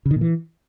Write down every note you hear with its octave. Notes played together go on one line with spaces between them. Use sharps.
C#3
D#3
A#2
E3